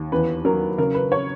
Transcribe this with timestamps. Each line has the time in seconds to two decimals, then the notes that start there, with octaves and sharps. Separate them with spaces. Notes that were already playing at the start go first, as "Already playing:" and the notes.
Already playing: D#2
0.12 E2 B4
0.45 F#3 A#4
0.78 C#3 A#4
0.94 B4
1.12 C#5